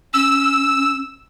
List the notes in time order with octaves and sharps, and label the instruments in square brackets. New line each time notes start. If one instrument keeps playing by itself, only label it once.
[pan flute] C#4 [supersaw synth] E6